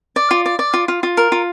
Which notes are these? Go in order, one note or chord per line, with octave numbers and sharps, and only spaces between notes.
D5
F4
D5
D5
F4
F4
F4
A#4
F4